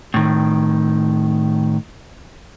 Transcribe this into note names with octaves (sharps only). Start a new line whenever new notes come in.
A2 D#3